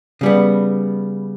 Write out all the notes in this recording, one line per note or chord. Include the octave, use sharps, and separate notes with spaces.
C#3 G3 B3